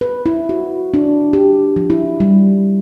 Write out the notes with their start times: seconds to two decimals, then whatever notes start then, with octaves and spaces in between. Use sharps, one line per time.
0.01 B4
0.26 E4
0.49 F#4
0.94 D4
1.33 G4
1.76 F3
1.90 E4
2.20 G3